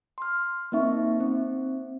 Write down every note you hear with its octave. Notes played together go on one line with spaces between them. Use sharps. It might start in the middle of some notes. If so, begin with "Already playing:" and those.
C6 F6
A#3 C4 D#4 E5 C#6
C4